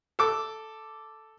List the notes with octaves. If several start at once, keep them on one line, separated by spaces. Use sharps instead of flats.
A4 D6